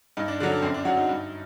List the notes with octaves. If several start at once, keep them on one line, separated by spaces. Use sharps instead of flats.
G2 D#4
D4
D3 F#3 D4
D4
F#2 C4
D4
F#3 F#4
D#4
G2